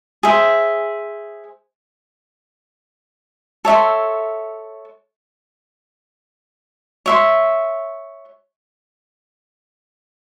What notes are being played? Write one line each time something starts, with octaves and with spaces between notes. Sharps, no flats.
G#4 C5 E5
A4 C#5 E5 C6
C#5 E5 C6